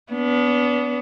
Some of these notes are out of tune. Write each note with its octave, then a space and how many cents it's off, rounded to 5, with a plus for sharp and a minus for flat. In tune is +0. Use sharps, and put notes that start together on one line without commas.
B3 +0 D4 -35